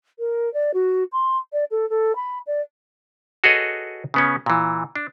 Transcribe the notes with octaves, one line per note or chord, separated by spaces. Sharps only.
A#4
D5
F#4
C6
D5
A4
A4
B5
D5
F#4 G#4 A4 B4 C#5 D#5
C#3 B3 C#4
A#2 E3
D4